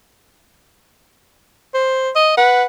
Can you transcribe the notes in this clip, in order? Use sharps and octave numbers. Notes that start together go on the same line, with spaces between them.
C5
D#5
B4 F#5